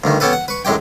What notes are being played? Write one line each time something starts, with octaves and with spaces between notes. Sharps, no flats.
D2 G2 D#3
B3 C#4 G4 A4 B4
F#5
B4 C#6
F#2 A2 G#3 G4 G5